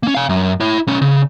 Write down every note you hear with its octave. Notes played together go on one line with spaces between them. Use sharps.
A#3 C#4
F5 G#5
F#2
E4 C#5
B1 C#4
C#3